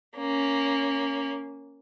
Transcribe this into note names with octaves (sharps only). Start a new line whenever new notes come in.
A#3 C#4